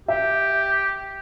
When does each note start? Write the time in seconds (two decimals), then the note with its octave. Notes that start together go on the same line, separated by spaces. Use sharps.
0.08 G4 E5